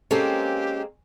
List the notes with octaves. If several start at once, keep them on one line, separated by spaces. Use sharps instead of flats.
G#3 A#3 C4 C#4 G4 A4